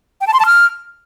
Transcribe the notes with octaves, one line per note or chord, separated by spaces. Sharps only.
G5
A5
C6
A5
F6